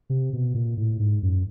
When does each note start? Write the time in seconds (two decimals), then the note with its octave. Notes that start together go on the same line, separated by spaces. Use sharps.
0.10 C3
0.33 B2
0.55 A#2
0.77 A2
0.99 G#2
1.23 F#2